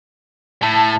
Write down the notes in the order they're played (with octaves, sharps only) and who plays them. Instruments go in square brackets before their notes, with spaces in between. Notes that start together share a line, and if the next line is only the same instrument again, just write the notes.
[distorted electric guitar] A2 [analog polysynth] A5